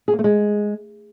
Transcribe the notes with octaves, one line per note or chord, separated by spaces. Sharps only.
G#4
A#3
A3
G#3